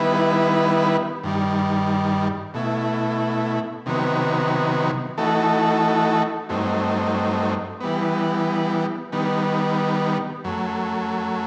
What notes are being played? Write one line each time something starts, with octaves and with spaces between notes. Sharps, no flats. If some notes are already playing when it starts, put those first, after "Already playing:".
Already playing: D#3 G3 B3 E4 B4
G2 D#3 G3
B2 A3 E4
C3 D#3 F#3 B3
E3 A3 D#4 F#4 A4
G2 F#3 A3 C4 D#4
E3 G3 B3
D#3 G3 B3
F#2 F#3 A3